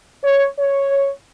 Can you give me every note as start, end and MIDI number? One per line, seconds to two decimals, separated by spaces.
0.23 0.45 73
0.59 1.09 73